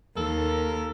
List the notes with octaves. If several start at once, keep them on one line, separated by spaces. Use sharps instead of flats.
D#2 A4 A#4